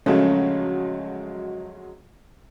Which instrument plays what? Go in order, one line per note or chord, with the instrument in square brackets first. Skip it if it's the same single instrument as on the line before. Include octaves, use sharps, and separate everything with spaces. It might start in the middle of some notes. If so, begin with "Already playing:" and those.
[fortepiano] A#1 C#3 A3 [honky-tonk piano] F#3 G#3 [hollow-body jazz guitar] C#4